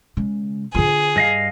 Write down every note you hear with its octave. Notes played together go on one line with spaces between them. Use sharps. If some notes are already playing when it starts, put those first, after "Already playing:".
C#3 G#3
D3 F4 G#4
G2 D#5 F5